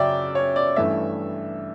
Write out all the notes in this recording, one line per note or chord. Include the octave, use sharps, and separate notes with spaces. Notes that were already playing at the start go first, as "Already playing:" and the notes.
Already playing: F#2 C#3 F#3 D5 E5 G5
C#5
D5
G2 E3 A3 C#4 E5